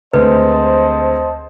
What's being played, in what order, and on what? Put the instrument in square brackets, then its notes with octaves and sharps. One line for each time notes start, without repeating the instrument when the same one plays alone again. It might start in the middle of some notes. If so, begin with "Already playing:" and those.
[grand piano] D2 G#3 C4 [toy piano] B4 [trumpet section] C5 D#5 A5